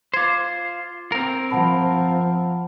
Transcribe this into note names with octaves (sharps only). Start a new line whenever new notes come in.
F4 C5 D6 G#6
C4 A#4
F3 F#5 A5 B5